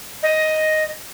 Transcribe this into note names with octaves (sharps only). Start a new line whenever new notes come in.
D#5